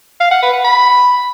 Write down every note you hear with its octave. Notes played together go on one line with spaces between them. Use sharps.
F5
F#5
B4
F#5
B5